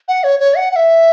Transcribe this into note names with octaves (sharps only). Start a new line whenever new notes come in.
F#5
C#5
C#5
F#5
F#5
E5